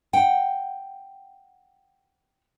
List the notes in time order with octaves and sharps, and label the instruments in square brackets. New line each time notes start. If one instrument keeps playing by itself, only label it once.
[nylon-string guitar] F#5 G5